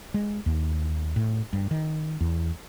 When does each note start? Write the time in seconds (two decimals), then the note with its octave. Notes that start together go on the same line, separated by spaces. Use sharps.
0.14 G#3
0.46 D#2
1.16 A2
1.53 G2
1.71 D#3
2.21 E2